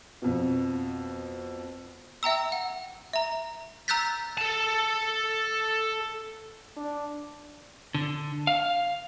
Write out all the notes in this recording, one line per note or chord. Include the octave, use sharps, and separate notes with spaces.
F2 B2
E5 G5 A#5 E6
F#5
E5 A#5
A#5 E6 F#6 G6 A6 B6
A4 A5
D4
D3
F5